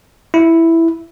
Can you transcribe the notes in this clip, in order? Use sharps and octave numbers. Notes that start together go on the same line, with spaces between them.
E4